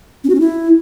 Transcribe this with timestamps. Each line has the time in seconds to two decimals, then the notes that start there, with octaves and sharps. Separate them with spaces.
0.24 C#4
0.30 F#4
0.35 C#4
0.40 E4